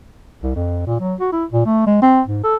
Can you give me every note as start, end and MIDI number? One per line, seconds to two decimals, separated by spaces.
0.43 0.52 36
0.56 0.83 41
0.87 0.97 46
1.00 1.15 54
1.20 1.29 66
1.33 1.45 64
1.52 1.65 46
1.66 1.86 57
1.87 2.00 56
2.02 2.22 60
2.28 2.43 44
2.44 2.56 69